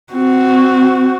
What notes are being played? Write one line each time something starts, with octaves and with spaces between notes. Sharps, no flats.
C4 F#4